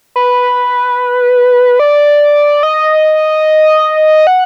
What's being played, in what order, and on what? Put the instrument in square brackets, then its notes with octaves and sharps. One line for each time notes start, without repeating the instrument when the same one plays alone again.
[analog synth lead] B4
D5
D#5
F#5